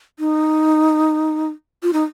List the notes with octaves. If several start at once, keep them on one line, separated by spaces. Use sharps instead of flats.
D#4
F4
D#4